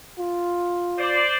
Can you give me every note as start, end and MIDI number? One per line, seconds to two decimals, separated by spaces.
0.19 1.23 65
0.98 1.36 72
0.98 1.36 74